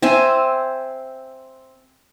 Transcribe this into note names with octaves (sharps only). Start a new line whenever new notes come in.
C4 C5 E5 G#5